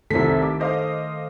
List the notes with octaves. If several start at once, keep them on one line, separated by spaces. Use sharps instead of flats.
C2 D#3 A3 C4 A4 B6
D6
C5 D#5 F5